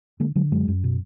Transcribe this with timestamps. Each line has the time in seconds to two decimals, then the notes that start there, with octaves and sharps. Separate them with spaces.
0.20 D3 G#3 A#3
0.35 D3 F#3 G#3
0.51 F#2 F#3 G#3
0.68 F#2
0.84 B2